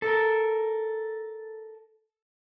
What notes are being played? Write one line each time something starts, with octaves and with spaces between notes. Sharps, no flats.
A4 A#4